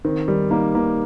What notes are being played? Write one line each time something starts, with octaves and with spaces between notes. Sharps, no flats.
D#3 C4
D#3 G3
A#3 D#4
D#3 A#3